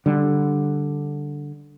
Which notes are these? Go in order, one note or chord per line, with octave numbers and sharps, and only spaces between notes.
D3 G3